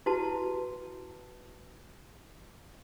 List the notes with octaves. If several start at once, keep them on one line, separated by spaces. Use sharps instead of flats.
E4 F#4 B4 A5